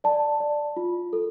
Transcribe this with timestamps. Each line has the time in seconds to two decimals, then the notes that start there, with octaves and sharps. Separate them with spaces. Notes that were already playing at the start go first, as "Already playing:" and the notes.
0.04 D5 A5
0.40 D5
0.77 F4
1.13 A4